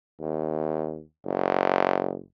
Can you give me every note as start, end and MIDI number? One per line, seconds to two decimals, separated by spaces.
0.20 1.03 39
1.25 2.20 30